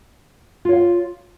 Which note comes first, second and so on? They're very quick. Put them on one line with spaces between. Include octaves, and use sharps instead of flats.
F4 C#5 F5